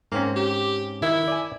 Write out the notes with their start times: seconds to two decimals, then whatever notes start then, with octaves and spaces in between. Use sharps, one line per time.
0.12 G#2 A#3 C4 C#4
0.36 G4
1.02 D#3 E4
1.28 D5 G#5